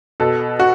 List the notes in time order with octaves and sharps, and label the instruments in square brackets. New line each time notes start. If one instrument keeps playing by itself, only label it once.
[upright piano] B2 A4
F#4